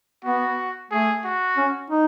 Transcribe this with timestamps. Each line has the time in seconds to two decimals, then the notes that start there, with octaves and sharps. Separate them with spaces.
0.24 B3 F#4
0.91 A3 G#4
1.24 F#4
1.57 C#4
1.90 D#4